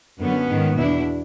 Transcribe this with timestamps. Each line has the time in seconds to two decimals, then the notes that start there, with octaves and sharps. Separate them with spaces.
0.20 F#2 D3 B3 C#4
0.49 G#2 D#3
0.76 E2 B2 D4 E4